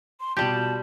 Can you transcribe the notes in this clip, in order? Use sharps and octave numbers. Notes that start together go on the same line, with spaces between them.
C6
B2 G3 F4 G4 A5 G6